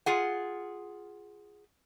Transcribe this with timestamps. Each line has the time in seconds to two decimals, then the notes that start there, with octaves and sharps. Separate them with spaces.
0.06 F4 G#4 F#5